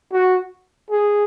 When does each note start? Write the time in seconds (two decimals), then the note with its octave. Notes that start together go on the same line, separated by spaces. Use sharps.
0.12 F#4
0.90 G#4